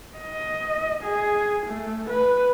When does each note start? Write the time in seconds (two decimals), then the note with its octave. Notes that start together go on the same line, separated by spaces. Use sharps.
0.18 D#5
1.03 G#4
1.66 A3
2.10 B4